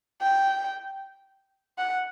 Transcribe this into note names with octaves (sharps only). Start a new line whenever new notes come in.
G5
F#5